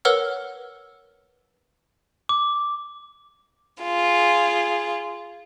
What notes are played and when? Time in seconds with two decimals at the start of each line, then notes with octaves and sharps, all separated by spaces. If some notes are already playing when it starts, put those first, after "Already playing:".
0.05 A#4 B4 C#5 F#5 E6 F6
2.29 D6
3.82 F4 G#4